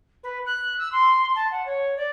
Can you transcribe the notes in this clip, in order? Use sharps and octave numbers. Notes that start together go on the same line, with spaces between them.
B4
F#6
E6
C6
A5
F#5
C#5
D5